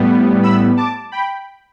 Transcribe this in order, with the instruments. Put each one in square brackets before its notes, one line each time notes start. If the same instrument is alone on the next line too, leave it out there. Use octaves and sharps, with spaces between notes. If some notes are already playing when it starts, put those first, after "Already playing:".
Already playing: [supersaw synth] A2 G3 B3
B5 E6
A5 D6
G5 B5